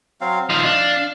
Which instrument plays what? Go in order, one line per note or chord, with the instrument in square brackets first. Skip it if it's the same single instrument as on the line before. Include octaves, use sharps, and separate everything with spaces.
[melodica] F#3 C4 F5
[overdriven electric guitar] F3 D#4 [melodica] F5
[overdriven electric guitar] D4